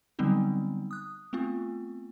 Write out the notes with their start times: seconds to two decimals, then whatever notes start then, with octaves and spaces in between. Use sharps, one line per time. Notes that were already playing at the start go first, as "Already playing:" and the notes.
0.19 D3 F#3 G3 B3 C4 D#4
0.91 D#6 F#6
1.33 A3 B3 C4 F4